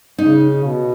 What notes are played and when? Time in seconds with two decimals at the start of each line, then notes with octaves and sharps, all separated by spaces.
0.18 C#3 D#4
0.64 B2